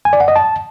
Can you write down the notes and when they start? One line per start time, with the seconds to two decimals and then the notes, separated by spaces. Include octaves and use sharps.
0.05 G#5
0.13 D5
0.20 F#5
0.28 D#5
0.36 A5